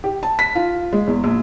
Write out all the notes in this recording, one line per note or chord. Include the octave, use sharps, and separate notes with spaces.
G4
A5
B6
F4
G#3
E2
A#1